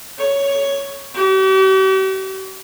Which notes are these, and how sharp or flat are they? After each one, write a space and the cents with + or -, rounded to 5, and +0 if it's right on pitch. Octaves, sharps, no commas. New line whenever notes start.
C#5 +5
G4 -45